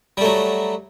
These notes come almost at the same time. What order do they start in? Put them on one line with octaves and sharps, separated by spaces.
G3 A3 F#3